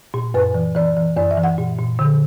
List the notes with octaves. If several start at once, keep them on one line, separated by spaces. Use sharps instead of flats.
A#2
F#2 B4
E3
E3 D5
E3
F#2 D5
E5
E3
F#5
A#2
A#2
D3